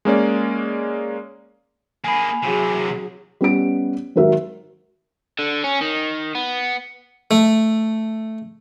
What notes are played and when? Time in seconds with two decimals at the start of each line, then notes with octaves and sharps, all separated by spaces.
0.05 G#3 A#3 C#4 D5
2.04 A#3 G#4 G#5 B5
2.43 C3 E3 F#3 G#4
3.41 G3 B3 C#4 D7
4.16 G#1 F#3 A#4 E5
5.39 D3
5.64 C#4
5.81 D#3
6.35 B3
7.31 A3